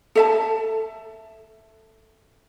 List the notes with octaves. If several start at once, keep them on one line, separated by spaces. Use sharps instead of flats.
A4 E5 A5